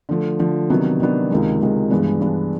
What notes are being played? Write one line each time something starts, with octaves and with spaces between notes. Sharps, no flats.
D3 F3 A3
D3 F3 A3
C3 D#3 F#3 B3 D4
C3 D#3 F#3 B3 D4
C#2 C3 D#3 G#3
C#2 C3 D#3 G#3
G2 E3 G#3 B3 D4
G2 E3 G#3 B3 D4